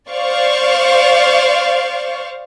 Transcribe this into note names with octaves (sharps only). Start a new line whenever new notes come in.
C5 D5 F5 C#6